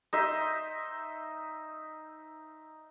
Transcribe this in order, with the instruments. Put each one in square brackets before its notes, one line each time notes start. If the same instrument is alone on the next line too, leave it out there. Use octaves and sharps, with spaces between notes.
[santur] D#4 C5 E5